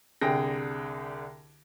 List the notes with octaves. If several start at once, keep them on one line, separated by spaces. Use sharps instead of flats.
C2 D3 G#4 G5 A#6